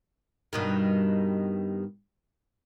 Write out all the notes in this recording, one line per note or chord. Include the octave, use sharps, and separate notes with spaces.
G2 B2 D#3